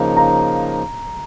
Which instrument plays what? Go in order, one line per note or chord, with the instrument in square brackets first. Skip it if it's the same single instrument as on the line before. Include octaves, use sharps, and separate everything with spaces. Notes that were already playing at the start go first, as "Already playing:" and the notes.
Already playing: [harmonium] C#3 F3 A#3 D#4
[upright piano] A#5